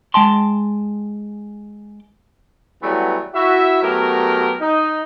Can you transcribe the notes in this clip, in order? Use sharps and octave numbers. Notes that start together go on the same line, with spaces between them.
G#3 G5 A5 C6
E3 F#3 G3 A3 B3
E4 F#4 E5
F#3 A3 B3 G4 A#4
D#4